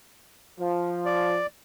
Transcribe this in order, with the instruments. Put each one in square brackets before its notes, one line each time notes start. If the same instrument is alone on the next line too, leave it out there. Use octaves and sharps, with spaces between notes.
[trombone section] F3
[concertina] D5